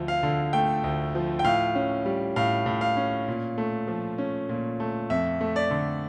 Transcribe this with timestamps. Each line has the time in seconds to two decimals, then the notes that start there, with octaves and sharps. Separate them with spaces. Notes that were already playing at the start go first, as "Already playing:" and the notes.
Already playing: D2 F3
0.08 F5
0.23 D3
0.53 A3 G5
0.84 D2
1.15 F3
1.39 G5
1.44 A2 F5
1.75 C#4
2.06 G3
2.36 A2 F5
2.66 A2
2.81 F5
2.97 C#4
3.28 A#2
3.58 A3
3.88 F3
4.18 C#4
4.49 A#2
4.80 A3
5.10 F2 E5
5.41 A3
5.56 D5
5.71 D3